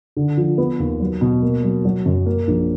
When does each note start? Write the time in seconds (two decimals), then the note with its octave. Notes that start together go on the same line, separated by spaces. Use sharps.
0.17 D3
0.37 F3
0.58 B3
0.79 D#2
1.00 F#3
1.21 B2
1.42 A#3
1.63 F#3
1.85 F#3
2.06 F#2
2.26 A#3
2.48 A#1